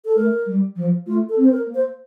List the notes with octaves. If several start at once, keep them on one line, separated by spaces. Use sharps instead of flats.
A4
A3 A#4
G3
F3
A3 F4
A4
C4
C5
A#4
A#3
C5